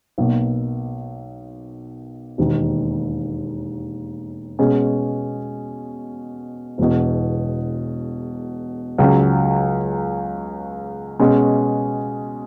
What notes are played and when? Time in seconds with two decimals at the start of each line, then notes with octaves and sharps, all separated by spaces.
0.18 B1 B2 A#3
2.38 E1 D#2 D#3
4.59 B2 G#3 C#4 G#4
6.78 E1 E2 B2
8.98 C#2 C#3 F#3 C#4
11.19 B2 G#3 C#4